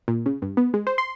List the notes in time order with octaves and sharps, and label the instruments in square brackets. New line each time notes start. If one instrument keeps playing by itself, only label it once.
[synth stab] A#2
C#3
G2
B3
G#3
C5
C6